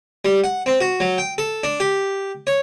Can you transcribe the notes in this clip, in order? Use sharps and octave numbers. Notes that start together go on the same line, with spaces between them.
G3
F#5
C4
F#4
F#3
G5
A4
D4
G4
C#5